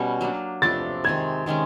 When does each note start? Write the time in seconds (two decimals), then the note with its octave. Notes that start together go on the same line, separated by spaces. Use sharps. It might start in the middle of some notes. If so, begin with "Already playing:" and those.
Already playing: B2 G3 C#4
0.21 F#3 A#3 D4
0.62 C3 F3 A3 D4 A6
1.04 C3 D#3 G#3 G#6
1.46 C3 D#3 G#3 C#4